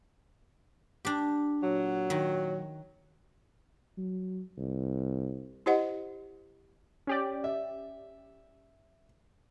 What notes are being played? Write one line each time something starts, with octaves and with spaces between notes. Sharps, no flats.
D4 G4
A#2 F#3
D#3
F#3
C2
E4 G4 C5 D#5 F#5
C#4 G4 D5
E5